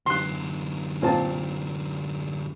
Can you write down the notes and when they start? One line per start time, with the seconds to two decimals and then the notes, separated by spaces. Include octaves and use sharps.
0.06 F#2 D3 C6 F#6
1.02 A#2 C4 A5